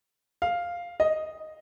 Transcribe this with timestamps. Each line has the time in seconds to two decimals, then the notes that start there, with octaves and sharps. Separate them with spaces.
0.42 F5
1.00 D#5